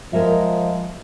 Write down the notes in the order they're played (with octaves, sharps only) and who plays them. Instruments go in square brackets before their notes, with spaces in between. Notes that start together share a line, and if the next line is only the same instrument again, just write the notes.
[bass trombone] F3 [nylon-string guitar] G#3 A#4 E5